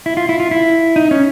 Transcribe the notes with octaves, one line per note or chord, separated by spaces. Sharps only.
E4
F4
E4
F4
E4
D#4
C#4